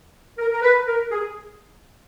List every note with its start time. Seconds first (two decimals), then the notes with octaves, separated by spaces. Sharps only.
0.38 A#4
0.51 A#4
0.62 B4
0.87 A#4
1.11 G#4